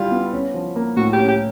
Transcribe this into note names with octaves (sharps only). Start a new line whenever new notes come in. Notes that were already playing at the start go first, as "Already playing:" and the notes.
Already playing: G3 E4 F4 G4
B3
C#4
F3
A#3
A2 F#4
G4
C#4
G4